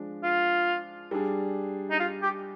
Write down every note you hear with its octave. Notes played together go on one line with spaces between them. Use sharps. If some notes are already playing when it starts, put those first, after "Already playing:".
Already playing: F3 G#3 D4
F4
G3 D4 G#4
D#4
F4
G4